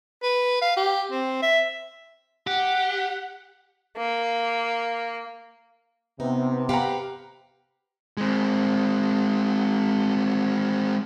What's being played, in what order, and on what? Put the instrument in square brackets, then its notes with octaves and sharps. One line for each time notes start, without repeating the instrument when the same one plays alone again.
[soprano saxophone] B4
F5
G4
C4
E5
[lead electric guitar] G4 [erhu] F#5
[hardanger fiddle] A#3
[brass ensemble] C3 [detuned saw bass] B3 [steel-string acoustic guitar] D#4
[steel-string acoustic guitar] G4 B4 C5 [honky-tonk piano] F5 F#5 A#5
[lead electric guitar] G#3 C4